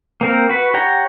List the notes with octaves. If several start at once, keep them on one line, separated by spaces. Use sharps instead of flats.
A#3 C4 A#4
F#4 B4
G4 C#5 F#5 A#5